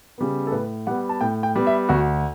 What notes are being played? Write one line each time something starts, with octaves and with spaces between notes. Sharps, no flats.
C#3 G3 B3
A4
A2 B4
G3 B3 F#5
A5
A2 G5
G5
G3 B3
E5
D2 F#4